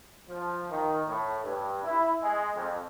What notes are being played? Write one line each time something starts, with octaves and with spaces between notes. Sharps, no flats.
F3
D#3
A2
G2
E4
G#3
F2